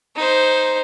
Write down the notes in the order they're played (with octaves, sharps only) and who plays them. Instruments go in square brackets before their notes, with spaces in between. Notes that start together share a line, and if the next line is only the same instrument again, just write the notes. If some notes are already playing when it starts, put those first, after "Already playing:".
[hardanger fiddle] D#4 C5